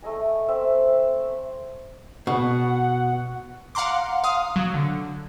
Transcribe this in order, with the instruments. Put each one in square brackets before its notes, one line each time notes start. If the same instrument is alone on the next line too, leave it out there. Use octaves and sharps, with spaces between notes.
[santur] A3 A4 D#5 G#5
C4 E5
[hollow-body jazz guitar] B2 [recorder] F#5
[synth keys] F5 F#5 A#5 C6 D6
F5 D#6
F#3
D3